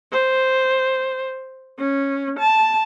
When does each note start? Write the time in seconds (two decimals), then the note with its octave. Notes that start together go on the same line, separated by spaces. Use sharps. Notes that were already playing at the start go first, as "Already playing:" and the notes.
0.12 C5
1.79 C#4
2.39 A5